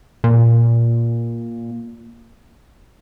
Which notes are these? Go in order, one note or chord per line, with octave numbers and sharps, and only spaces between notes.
A#2